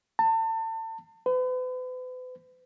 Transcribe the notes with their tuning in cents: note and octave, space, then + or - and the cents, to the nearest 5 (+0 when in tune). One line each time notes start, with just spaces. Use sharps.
A5 +35
B4 +40